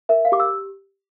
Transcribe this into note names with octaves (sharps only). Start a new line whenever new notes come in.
A#4 E5
F5
G4 D6
E6